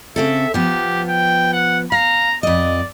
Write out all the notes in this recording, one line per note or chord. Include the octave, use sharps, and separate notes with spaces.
C#3 C4 A4 E5
F3 B3 G4
G5
F#5
F5 A#5
F2 D5 D#5